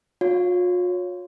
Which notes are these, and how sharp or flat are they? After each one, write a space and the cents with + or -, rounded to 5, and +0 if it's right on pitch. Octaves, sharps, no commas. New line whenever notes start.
F4 +45 C#5 +0 F5 +0